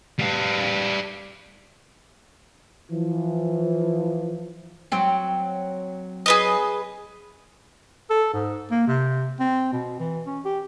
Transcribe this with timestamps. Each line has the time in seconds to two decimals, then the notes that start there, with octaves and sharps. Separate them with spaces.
0.19 G3 F5
2.91 E3 F3
4.92 F#3 C4
6.26 G#4 B4 D#5
8.10 A4
8.33 G#2
8.71 A#3
8.87 C3
9.40 C4
9.73 B2
9.99 E3
10.26 C#4
10.45 G4